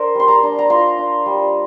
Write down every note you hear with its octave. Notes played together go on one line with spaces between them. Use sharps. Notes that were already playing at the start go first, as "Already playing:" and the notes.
Already playing: D4 A#4 C5
G3 C6
A#5
D4
A#5
F4 C6
D4
G3